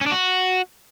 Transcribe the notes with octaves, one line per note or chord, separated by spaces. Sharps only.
C#4
D4
F#4